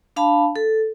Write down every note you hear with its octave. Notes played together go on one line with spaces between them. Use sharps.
D4 F5 A5 B5
A4